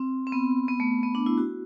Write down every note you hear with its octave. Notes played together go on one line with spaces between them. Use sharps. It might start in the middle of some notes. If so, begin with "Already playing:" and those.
Already playing: C4
C4
B3
B3
A3
B3
D4
E4
F#4